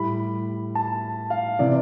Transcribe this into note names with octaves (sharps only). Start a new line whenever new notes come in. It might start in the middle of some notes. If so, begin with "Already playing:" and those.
Already playing: A2 G3 B5
A5
F5
C3 E3 D5